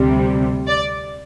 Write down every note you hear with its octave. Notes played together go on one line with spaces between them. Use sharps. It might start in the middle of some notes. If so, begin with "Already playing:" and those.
Already playing: D2 C3 G3
D5